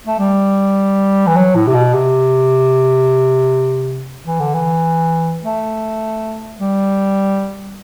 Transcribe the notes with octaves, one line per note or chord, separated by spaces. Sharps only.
A3
G3
E3
F#3
A2
C3
B2
C3
E3
D3
E3
A3
G3